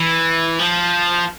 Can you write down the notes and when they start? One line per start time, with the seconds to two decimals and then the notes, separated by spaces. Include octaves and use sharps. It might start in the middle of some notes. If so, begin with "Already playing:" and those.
Already playing: E3
0.59 F3